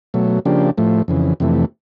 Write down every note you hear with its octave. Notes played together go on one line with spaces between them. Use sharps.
B2 F#3 A3
C#3 F3 A#3 D4 G4
A2 F3 A3
F2 C#3 E3
F2 C3 E3 A3